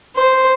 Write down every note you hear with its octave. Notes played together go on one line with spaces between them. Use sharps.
C5